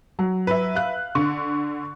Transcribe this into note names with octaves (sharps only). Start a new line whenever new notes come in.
F#3
B4 E5
F5 F#6
D3 C#6